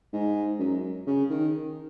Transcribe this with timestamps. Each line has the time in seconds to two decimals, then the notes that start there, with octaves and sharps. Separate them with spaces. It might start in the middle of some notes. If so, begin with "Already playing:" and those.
0.13 G#2
0.59 F#2
1.06 C#3
1.30 D#3